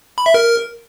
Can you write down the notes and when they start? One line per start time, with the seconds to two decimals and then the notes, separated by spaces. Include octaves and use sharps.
0.18 B5
0.26 E5
0.34 A#4